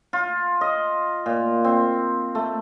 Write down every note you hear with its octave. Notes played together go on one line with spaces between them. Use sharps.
F4
D#5
A#2
C4
A3